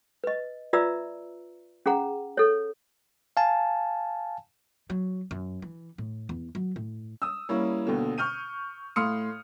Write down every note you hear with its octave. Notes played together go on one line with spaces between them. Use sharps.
B4 D#5
F4 B4 D5 E5 A#5 E6
C#4 G#4 F#5 A#5
A4 C#5
F5 G#5 A5
F#3
F#2
E3
A2
E2
F#3
A2
D#6 E6
G3 A#3 C#4 E4 C#5
D#2 B2 D3
C#6 F6 G6 D#7
A2 F5 C6 D#6 F6 C#7